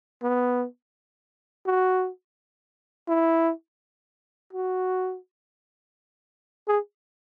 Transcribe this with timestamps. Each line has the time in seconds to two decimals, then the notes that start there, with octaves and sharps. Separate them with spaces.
0.22 B3
1.66 F#4
3.08 E4
4.53 F#4
6.68 G#4